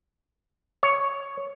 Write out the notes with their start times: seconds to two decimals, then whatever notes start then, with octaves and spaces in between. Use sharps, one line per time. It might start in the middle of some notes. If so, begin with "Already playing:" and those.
0.83 C#5